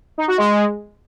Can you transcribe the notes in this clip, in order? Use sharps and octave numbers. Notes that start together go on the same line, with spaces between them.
D#4
F#4
G#3